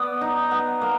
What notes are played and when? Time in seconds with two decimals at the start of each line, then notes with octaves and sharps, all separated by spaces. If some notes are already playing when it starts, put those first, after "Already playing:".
Already playing: B3 D5
0.21 D#4
0.51 B3
0.81 A#3